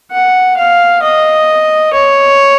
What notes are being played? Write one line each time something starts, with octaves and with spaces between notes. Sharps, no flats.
F#5
F5
D#5
C#5